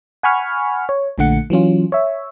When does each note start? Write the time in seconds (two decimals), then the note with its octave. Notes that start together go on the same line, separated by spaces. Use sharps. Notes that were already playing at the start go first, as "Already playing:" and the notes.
0.23 F#5 G#5 B5 C#6 F6
0.89 C#5
1.18 A#1 A#2 D3 A3 F#5 C#7
1.50 E3 F#3 C#4 F4
1.92 C#5 E5